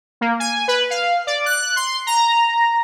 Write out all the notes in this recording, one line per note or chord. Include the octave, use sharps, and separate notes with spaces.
A#3
G#5
B4
F5
D5
F#6
C6
A#5